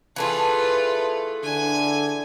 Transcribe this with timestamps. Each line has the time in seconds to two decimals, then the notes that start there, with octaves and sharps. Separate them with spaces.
0.16 E3 A3 F4 G#4 B4
1.43 D3 G#5